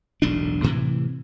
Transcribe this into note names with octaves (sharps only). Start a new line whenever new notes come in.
E1 B1 A2 D4
A2 C3 E3